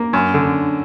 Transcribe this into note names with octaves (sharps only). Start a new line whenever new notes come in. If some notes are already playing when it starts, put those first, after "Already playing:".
Already playing: A#3
F#2
D3